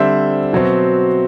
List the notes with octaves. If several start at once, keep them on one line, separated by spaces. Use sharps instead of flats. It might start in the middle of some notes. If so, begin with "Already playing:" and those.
Already playing: D3 G3 C4 C5 E5
B2 F#3 C4